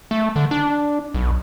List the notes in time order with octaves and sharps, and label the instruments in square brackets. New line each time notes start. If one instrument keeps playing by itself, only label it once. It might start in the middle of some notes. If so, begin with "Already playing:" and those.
[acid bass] A3
D3
D4
B1